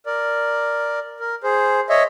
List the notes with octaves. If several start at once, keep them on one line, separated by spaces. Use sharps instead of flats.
A#4 D5
A#4
G#4 C5
C#5 D#5 E5